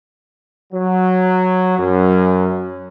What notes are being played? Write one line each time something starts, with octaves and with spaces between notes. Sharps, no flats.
F#3
F#2